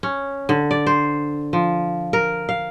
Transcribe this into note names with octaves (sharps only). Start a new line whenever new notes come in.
C#4
D3
D5
C5
F3
A#4
F5